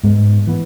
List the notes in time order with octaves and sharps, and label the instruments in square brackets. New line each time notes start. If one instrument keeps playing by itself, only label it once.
[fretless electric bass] G#2 G#3 B3
E3 B3